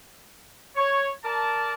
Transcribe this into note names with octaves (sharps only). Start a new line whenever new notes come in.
C#5
A#4 D5 A5